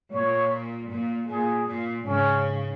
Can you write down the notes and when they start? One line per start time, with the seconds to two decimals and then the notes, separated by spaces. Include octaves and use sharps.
0.13 A#2 C#5
0.90 A#2
1.29 A#2 G#4
1.68 A#2
2.07 G#2 C#3 C#4